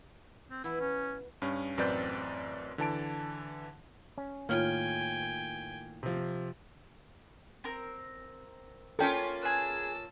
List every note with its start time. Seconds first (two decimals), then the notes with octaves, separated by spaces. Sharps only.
0.50 C4
0.64 E3 B3 E4 B5
0.80 C#4
1.42 G2 C#4
1.77 A1 F#2 C4 B4 D5 G6
2.78 D3 E3 A5 D7
4.18 C#4
4.49 A2 D#3 A#3 F4 C#5 G5 G#5 F6
6.03 C3 F3
7.64 C4 A#4
8.99 A#3 C#4 F4 A4 G5
9.43 G#4 B4 A5 E6